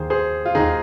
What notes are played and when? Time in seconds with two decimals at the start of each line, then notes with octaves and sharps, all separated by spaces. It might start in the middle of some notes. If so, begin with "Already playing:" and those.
Already playing: D#2 D#3 G#4 C5
0.10 G#4 C5
0.46 F4
0.55 D#2 D#3 D#4 G#4